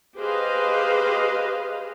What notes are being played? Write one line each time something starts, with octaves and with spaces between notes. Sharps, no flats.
G4 G#4 B4 C5 D#5 F5